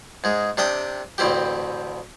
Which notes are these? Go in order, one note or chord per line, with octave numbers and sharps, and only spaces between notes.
G#2 G#3
C3 D4 E5 G5 D#6
A1 D2 C4 E4 G4